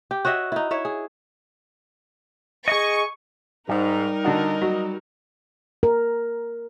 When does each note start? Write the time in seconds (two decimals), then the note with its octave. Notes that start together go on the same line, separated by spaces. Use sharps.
0.11 G4
0.25 F#4 C#5 D#5 E5
0.52 D#4 E4
0.71 E4 C#5 E5
0.85 G#4
2.68 G#4 D#5 C#6
3.69 G#2 G3 D#4 A#4
4.24 D3 D4 F#4 D#5
4.62 F#3
5.83 A#4